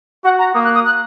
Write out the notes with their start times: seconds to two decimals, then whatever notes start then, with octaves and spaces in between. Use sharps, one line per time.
0.24 F#4 F#5
0.39 A#5
0.54 A#3 D#6
0.64 F#6
0.75 D#6
0.85 F#6